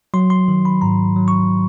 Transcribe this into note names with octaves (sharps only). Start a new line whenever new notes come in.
F#3 C6
C6
D#3
B5
G#2 A#5
F#3
C#6